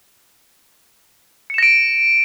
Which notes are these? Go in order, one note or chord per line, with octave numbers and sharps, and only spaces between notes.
A#6 C#7 D7 E7